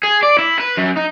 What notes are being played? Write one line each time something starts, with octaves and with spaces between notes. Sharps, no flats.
G#4
D5
E4
B4
F#2
D#4